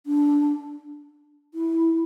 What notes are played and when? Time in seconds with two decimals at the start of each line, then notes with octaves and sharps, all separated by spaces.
0.06 D4
1.54 E4